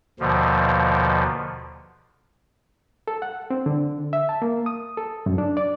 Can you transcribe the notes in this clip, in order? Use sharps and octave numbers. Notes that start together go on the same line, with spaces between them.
D#2 B2 D3 F3
A4
F#5
C4
D3
E5
A5
A#3
D#6
A4
F#2
D4
D5